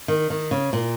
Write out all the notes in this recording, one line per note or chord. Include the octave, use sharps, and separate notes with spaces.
D#3
D#3
C#3
A#2